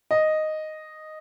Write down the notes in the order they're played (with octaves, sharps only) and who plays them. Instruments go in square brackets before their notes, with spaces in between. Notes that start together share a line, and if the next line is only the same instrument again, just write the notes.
[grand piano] D#5